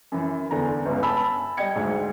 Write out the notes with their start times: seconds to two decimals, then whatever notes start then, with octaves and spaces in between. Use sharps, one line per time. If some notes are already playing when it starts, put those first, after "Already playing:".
0.12 F#2 E3
0.51 E2 D3 A#5
0.86 G1 C#2
1.03 G#5 A5 B5 E6
1.57 G3 D#5 G5 G#6 C#7
1.75 D2 G#2